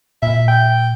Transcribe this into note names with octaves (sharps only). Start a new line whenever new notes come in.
A#2 E5
G5